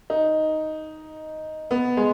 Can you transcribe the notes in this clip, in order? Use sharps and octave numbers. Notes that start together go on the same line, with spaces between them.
D#4
B3
G#3